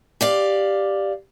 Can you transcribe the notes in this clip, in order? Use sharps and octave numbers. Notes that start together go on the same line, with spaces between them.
G4 D5 F5